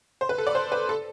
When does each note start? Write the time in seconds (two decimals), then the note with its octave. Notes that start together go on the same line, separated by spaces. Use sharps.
0.21 C5
0.29 B4
0.38 A4
0.47 D5
0.55 C5
0.72 B4
0.89 A4